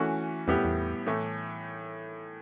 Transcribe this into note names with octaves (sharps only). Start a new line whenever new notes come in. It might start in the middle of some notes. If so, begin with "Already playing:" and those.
Already playing: E3 A3 C#4 F#4
E2 A2 G3 B3 E4 G4
E2
A2 E3 A3